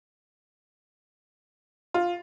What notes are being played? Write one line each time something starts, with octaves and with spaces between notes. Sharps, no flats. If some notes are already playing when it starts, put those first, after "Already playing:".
F4